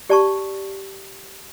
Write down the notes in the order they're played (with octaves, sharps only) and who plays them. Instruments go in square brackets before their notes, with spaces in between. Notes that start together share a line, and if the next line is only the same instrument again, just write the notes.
[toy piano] G4 D5 A5 C#6